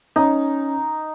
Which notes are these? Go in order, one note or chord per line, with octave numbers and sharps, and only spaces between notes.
C#4 D#4